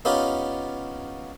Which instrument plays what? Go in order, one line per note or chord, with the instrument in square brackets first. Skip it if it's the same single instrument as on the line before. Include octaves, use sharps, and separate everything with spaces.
[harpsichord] B3 C#4 D#4 F4 G4